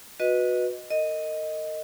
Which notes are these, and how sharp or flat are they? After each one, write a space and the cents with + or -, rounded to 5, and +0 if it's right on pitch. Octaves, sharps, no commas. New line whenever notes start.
F#4 -20 B4 +0 D#5 +0
A#4 -35 D#5 +0